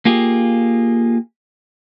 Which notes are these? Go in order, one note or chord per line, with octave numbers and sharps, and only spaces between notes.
A#3 F4 G4 G#4